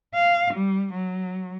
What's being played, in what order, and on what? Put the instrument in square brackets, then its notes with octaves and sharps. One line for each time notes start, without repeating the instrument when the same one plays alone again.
[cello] F5
G3
F#3